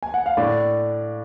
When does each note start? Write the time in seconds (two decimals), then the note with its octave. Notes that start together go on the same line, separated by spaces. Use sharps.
0.03 G#5
0.14 F#5
0.26 F5
0.37 A2 D4 D5